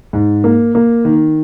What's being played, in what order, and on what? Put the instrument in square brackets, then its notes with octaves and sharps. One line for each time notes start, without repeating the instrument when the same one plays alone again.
[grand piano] G#2
A#3
A#3
D#3